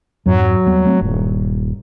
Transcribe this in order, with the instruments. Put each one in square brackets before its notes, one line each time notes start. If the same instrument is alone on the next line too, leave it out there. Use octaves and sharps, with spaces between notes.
[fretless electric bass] F2 G#2 [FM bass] F#3
[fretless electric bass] D#2 G3 B3
A3 C4
[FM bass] D#1 [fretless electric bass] G2